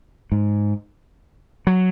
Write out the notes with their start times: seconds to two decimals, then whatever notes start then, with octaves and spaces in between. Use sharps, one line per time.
0.32 G#2
1.67 F#3